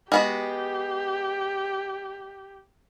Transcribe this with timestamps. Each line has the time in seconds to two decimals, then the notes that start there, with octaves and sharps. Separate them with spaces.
0.12 G#3 B3 F#4 G4